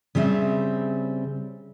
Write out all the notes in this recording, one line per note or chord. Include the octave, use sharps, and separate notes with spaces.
C#3 G3 C4 E5